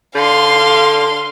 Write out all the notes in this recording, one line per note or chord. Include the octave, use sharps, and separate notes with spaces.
D3 F5 C6